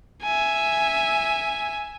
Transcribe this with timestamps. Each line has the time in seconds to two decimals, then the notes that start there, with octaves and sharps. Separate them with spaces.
0.23 E5 G#5